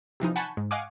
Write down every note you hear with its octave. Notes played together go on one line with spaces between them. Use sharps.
C3 E3 F3 D#4
F#5 G#5 A5 B5 C#6 G6
G#2
D#5 F5 F#5 G#5 C#6 D6